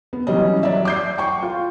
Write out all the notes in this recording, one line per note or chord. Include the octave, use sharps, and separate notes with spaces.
B3
E3 F#3 G3 C#4 D#5
F#3 D5 E5
D6 G6 C7
G5 C#6
F4